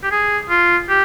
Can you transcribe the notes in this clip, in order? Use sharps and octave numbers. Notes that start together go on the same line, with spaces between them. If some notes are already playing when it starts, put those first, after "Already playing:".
G4
G#4
F4
G4